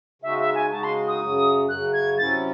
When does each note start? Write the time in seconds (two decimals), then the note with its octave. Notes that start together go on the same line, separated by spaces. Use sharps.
0.22 C#3 G#3 D#4 F#4 E5
0.39 E5
0.55 G#5
0.71 C#3 G#3 D#4 F#4 A5
0.84 C6
1.08 D#6
1.21 F#2 C#3 F#3
1.69 F#2 C#3 F#3 F#6
1.93 G#6
2.18 C3 F#3 C#4 E4 A6